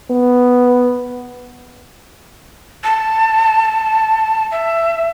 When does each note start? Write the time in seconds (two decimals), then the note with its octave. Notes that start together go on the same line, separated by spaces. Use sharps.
0.11 B3
2.84 A5
4.52 E5